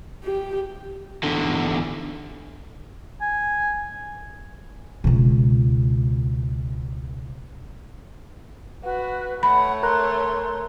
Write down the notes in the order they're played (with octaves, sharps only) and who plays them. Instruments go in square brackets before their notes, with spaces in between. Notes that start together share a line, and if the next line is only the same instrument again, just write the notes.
[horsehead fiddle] G4
[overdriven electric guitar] E2 D3
[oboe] G#5
[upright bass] C#2 B2
[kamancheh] F#4 [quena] B4
[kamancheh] A3 C#5 [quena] F#5 [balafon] B5
[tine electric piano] A#4 A#5 F#6 [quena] C6